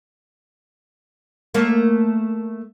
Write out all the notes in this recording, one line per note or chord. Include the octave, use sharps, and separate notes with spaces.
A3 A#3